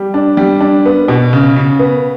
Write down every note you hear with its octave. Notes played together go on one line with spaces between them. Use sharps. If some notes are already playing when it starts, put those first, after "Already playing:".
Already playing: G3
D4
G3
D4
B3
B2
C#3
C#3
B3